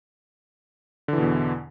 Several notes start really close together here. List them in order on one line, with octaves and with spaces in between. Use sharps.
D3 E3 B2 E2